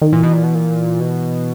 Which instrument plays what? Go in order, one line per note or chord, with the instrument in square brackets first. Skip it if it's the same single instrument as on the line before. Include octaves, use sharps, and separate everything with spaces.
[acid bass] D#3
[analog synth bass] A#2 [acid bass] E3
[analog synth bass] B2
A#2
B2
A#2
B2